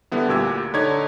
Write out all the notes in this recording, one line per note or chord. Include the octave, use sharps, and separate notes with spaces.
D3 G3 B3 E4
D2 A#2 G4 E6 G#6
D3 D#4 C#5 G#6